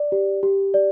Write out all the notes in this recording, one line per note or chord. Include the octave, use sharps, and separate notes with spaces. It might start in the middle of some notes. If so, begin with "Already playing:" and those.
Already playing: D5
G4
G4
D5